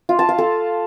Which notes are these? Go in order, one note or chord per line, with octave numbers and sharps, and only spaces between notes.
F4
A5
F5
A4